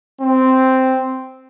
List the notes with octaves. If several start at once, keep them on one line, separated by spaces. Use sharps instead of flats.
C4